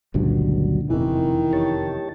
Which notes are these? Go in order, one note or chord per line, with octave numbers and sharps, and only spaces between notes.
G1 C#2 G2 A#2 D3 F#3
F1 E2 C3 D#3 E3
G4 C#5 A5